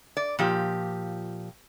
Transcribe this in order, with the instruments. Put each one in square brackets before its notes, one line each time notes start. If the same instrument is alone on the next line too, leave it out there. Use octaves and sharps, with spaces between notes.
[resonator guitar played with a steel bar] D5
A#2 F3 G4